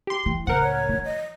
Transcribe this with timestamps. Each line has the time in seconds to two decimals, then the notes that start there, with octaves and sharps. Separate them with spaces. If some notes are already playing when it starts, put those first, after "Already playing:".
0.07 G4 C6
0.26 E3
0.47 C#2 A2 A#4 C5 F#5
0.62 C#5
0.89 E3 F3
1.05 D#5